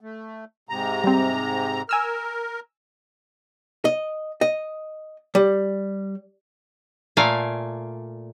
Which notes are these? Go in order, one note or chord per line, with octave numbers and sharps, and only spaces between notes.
A3
G#2 C3 A#5
G3 C4
A#4 G#5 E6 F6
D#5
D#5
G3
A#2 A3 F5 G#5